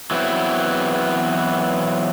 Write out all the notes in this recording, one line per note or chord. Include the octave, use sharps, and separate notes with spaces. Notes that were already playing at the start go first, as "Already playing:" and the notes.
E3 F#3 B3 C4 E4